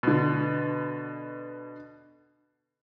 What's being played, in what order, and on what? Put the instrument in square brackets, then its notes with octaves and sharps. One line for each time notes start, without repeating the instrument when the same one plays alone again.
[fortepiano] B2 D3